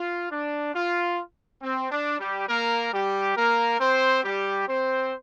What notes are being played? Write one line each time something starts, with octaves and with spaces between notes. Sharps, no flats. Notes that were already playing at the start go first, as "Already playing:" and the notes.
Already playing: F4
D4
F4
C4
D4
G3 G4
A#3 A#4
G3 G4
A#3 A#4
C4 C5
G3 G4
C4 C5